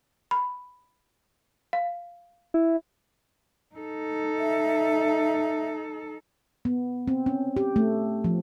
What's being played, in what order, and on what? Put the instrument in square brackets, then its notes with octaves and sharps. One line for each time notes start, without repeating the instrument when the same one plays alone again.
[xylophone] B5
F5
[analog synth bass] E4
[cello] D#4 A4
[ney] E5
[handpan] B3
C4
C#4
G4
A3
F3